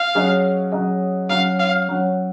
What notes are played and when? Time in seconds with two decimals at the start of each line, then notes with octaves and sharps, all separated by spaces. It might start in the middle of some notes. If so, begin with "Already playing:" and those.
Already playing: F5
0.15 F#3 C#4 G#4 D#5
0.72 F#3 C#4 G#4 D#5
1.30 F#3 C#4 F#4 F5
1.59 F5
1.89 F#3 C#4 F#4